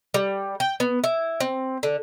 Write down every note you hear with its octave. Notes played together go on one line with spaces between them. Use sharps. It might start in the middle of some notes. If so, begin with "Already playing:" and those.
G3
G5
B3
E4
C4
D3